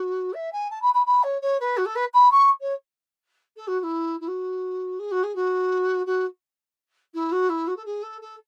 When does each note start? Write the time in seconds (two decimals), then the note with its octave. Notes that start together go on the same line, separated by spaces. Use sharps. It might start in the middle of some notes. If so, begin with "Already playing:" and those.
Already playing: F#4
0.33 E5
0.52 G#5
0.70 A5
0.81 B5
0.94 B5
1.06 B5
1.23 C#5
1.41 C#5
1.60 B4
1.77 F#4
1.85 A4
1.95 B4
2.13 B5
2.31 C#6
2.60 C#5
3.56 A4
3.67 F#4
3.79 F#4
3.83 E4
4.20 E4
4.27 F#4
4.99 G#4
5.11 F#4
5.23 G#4
5.35 F#4
6.06 F#4
7.14 E4
7.31 F#4
7.49 E4
7.67 F#4
7.76 A4
7.85 G#4
8.02 A4
8.21 A4